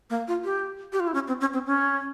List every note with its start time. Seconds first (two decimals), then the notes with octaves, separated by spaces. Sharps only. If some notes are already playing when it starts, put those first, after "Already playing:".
0.10 A#3
0.28 F4
0.44 G4
0.93 G4
1.00 F4
1.08 E4
1.14 C#4
1.28 C4
1.41 C#4
1.54 C4
1.67 C#4